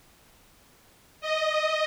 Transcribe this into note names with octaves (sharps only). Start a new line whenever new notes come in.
D#5